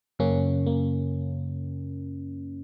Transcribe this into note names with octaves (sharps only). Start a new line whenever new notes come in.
F#2 C#3 A#3 C#4
A#3